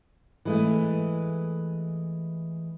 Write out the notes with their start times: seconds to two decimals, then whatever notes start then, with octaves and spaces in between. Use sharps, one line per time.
0.45 E3 G#3 A3